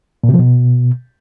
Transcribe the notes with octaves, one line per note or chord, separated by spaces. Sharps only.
A#2
C3
F3
B2